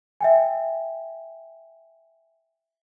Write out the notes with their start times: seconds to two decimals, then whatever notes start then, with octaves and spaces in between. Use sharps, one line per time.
0.21 E5 G5 G#5